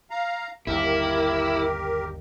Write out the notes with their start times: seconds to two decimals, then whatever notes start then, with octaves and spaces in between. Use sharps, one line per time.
0.11 F5 A#5
0.67 G1 D#2 E4 G4 A#4